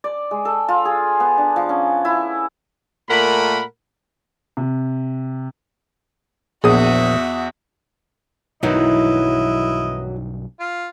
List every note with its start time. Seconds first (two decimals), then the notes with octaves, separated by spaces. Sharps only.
0.04 D5
0.31 G#3
0.45 A4
0.68 F4
0.85 G#4
1.20 B3
1.38 D4
1.56 F3
1.69 C#4
2.05 E4
3.09 A#2 A3 A#4 F#5 B5
4.57 C3
6.64 A#1 E2 F#4 G#4 E5 D#6
8.63 B1 G2 D#3 E3 F#3 D#4 E4 D#5
10.60 F4